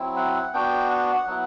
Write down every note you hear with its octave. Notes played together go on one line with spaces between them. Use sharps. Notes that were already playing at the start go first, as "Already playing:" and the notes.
Already playing: F#3 C4 E4
F#5
B3 D4 F#4 G5
F#5
F#3 B3 E4